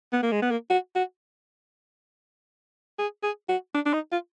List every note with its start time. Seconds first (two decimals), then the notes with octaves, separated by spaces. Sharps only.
0.13 B3
0.23 A#3
0.32 G#3
0.42 B3
0.51 A#3
0.70 F#4
0.95 F#4
2.99 G#4
3.23 G#4
3.49 F#4
3.74 D4
3.86 D4
3.94 D#4
4.12 F4